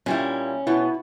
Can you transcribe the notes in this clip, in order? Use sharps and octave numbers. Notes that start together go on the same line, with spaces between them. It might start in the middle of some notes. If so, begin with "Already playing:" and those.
A#2 G3 C#4 E4
B2 B3 E4